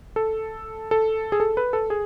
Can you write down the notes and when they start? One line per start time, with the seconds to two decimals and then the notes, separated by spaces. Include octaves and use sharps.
0.16 A4
0.91 A4
1.32 G#4
1.40 A4
1.57 B4
1.73 A4
1.90 G#4